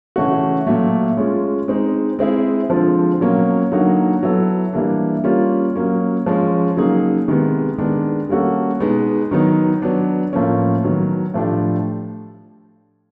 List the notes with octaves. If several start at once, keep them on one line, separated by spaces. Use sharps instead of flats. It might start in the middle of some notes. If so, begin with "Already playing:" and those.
C#3 E3 A3 C#4 F#4
A#2 F#3 A3
G#3 C#4 F4 G#4
G#3 C4 D#4
G#3 C4 E4 G#4
D3 F3 G#3 C4 F4
B2 F#3 A#3 C#4
D3 F#3 A#3 D#4 F#4
F#3 B3 E4 A4
E3 G3 A#3 D4
G3 A#3 C#4 F4
F#3 A#3 C#4
F3 G#3 C#4
C#3 F#3 A#3 D#4 G#4
C3 D#3 G#3 B3
D#3 G#3 B3 D4
G3 A#3 C#4 F#4 A4
B2 G#3 B3 D#4
D#3 F#3 B3 D#4
F#3 B3 D4
A2 F3 A#3 C#4
D#3 F#3 B3
A2 F3 A3 D4 G4